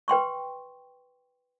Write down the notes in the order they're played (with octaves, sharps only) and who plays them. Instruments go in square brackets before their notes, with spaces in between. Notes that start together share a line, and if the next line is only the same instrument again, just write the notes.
[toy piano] B4 G5 C6 C#6